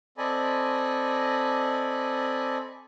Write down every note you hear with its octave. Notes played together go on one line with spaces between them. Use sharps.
C4 A4 D5 D#5 G#5 B5